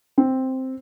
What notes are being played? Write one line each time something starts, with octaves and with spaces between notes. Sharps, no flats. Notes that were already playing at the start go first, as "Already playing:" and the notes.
C4